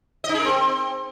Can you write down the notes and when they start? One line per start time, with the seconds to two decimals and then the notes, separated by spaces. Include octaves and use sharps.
0.24 D#5
0.29 D#4
0.34 G#4
0.39 A#4
0.45 C4